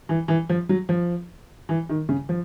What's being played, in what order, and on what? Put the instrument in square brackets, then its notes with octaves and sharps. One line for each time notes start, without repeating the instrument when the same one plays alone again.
[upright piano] E3
E3
F3
F#3
F3
E3
D#3
C#3
F3